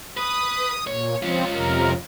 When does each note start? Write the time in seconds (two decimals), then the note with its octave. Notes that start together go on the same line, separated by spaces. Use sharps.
0.17 B4 D#6
0.87 A#2 C#5
1.23 F3 C4 C#4 F4
1.53 F2 C3 A#4